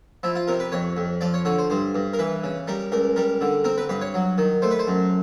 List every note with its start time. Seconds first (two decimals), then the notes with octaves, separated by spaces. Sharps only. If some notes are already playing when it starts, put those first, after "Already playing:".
0.23 F3 E4
0.35 F4
0.48 C3 A#4
0.60 B4
0.72 F2 C#5
0.97 F2
1.21 F3 D5
1.34 C#5
1.45 D3 C#5
1.58 C5
1.70 G2 C5
1.95 G2
2.13 A#4
2.19 E3 B4
2.44 C#3
2.68 G3 A#4
2.92 C#2 A#4
3.16 G3 A#4
3.41 D3
3.64 C4 A#4
3.78 B4
3.89 G2 B4
4.01 C#5
4.14 F#3
4.38 D#3
4.62 A3 C5
4.71 B4
4.79 C5
4.87 F#2